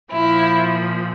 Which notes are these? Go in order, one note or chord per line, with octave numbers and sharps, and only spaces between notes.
A#2 F3 E4